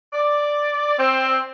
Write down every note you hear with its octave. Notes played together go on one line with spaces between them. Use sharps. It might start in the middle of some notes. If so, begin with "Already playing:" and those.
D5
C4